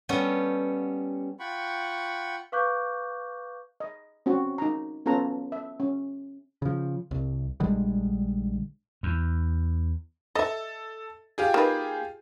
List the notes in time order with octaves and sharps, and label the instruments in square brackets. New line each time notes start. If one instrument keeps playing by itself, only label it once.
[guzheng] G3 B3 C#4 A4
[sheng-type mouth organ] F4 F#5 G5 B5 C#6
[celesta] B4 F5 C#6 D6 F#6 G6
[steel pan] D#5
C4 C#4 F#4
D#4 A#5
B3 C#4 F4 A4 A#5
E5
C#4
[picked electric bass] C#3 F3
C2
A#1 D3 G3 G#3
[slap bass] E2
[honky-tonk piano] A4 [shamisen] D#5 E5
[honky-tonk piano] F4 G4 G#4
[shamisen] A#3 D#4 B4